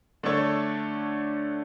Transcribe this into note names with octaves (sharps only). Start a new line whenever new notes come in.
D3 A3 D4 A4 C#5